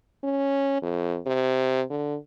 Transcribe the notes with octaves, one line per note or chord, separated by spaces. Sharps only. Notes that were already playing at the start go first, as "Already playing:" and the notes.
C#4
F2
C3
D3